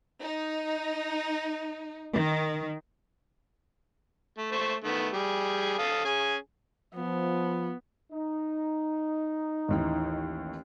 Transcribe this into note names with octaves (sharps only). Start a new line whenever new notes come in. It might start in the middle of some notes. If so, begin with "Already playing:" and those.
D#4
D#3
A3
A3 C5 C#6
D#3 A3 B3
G3 G#4
A4 F5 D#6
C#4 G#4 G#5
F3 B3
D#4
A1 D#2 E3